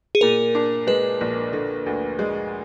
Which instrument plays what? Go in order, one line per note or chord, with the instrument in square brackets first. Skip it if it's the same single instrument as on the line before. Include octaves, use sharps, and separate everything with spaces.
[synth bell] G#4
[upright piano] A#2 [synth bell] A#4
[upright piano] D4
[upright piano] G#3 [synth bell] B4
[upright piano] A#1
D3
D2
G#3